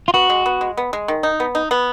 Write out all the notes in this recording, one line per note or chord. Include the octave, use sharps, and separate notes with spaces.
F4
B3 F#4
G#3
B3
G#3
B3
G#3
D#3
D#4
B3
D#4
B3